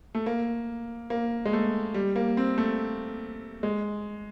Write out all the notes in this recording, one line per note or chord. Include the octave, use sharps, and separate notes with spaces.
A3
A#3
A#3
G#3
A3
G3
A#3
C4
A3
G#3